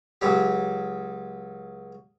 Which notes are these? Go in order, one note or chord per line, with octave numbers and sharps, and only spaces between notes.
C#2 F#3 G4